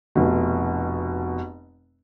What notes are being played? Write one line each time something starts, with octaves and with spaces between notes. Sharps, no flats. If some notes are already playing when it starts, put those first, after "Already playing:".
F1 B2